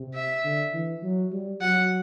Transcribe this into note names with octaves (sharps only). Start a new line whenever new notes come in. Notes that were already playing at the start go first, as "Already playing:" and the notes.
Already playing: C3
E5
D3
E3
F#3
G3
F#3 F#5